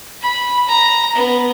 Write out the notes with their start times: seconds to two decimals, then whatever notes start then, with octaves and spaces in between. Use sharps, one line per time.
0.22 B5
0.68 A#5
1.15 B3